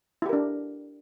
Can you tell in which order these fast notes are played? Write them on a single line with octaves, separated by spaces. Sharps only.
E4 G4 A#4 D4